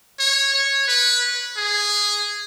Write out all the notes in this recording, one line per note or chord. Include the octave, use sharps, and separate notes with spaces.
C#5
C#5
B4
G#4